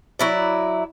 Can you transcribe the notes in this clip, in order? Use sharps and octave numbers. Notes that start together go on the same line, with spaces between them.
F#3 E4 D5